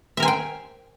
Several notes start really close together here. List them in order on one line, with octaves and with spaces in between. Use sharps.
E5 A#4 G#5 C5 G5